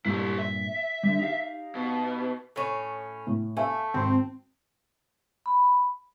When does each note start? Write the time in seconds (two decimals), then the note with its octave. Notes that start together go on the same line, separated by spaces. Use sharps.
0.05 G2 A#2 E4 G4
0.39 E5
1.03 D3 G3
1.19 D#4 G4 F5
1.75 B2
2.56 A2 C#4
3.27 A2
3.57 A3 E5 F5 G#5
3.94 G#1 C4 C6
5.46 B5